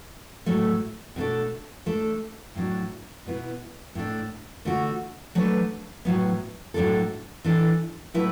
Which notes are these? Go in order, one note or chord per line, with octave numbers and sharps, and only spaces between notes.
A2 F#3 A3
B2 A3 D4 A4
A3 D4 A4
A2 F#3 D4
B2 B3 E4
A2 A3 D4
D3 A3 D4 F#4
F#3 A3 D4 B4
A2 F#3 B3
A2 F#3 D4 A4
E3 D4 A4
A2 F#3 A3 E4 B4